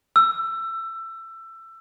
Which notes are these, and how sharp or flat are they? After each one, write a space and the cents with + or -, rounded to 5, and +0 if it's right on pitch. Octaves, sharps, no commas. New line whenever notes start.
E6 +20